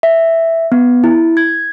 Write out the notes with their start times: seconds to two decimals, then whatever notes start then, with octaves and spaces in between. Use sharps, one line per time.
0.03 E5
0.72 B3
1.04 E4
1.37 G#6